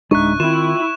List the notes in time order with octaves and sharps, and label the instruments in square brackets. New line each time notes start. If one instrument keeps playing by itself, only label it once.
[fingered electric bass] D1 G1 D4 [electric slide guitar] G#3 D#4 E5 [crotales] C#6 F#6
[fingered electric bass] D#3 C4 [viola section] E4 [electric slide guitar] F4 G5 [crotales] E7